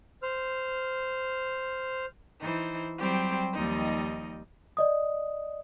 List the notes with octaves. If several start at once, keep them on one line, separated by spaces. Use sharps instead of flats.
C5 F6
E3 D#4 C5
F#3 G3 C4 G4 C5
D#2 F3 G3 D#4 D#5
D5 D#5 D#6